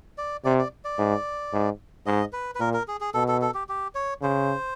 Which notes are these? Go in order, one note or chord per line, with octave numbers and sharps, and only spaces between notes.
D5
C3 D5
D5
D5
G#2
G#2
G#2 D#5
B4
B4
A#2 A#4
A#4
G#4
G#4
B2 A4
A4
A4
G4
G4
C#5
C#3 C5